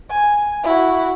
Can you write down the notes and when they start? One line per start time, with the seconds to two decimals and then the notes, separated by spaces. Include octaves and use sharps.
0.10 G#5
0.64 E4 F#4